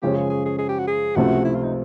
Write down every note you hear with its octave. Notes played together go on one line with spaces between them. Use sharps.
F#2 C#3 F3 G#3 C#4 G4
G#4
G#4
G#4
G#4
G4
F#4
G#4
C#2 C3 F3 A3 C4 F#4
E4
F4
D#4